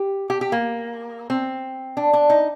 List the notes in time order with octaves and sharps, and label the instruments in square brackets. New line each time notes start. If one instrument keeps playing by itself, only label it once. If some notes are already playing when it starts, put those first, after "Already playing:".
Already playing: [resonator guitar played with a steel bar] G4
G4
G4
A#3
C4
D4
D4
D#4